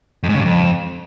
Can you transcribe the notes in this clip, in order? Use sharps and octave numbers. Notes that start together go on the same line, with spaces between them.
F2
G#2
C#3
G2
F2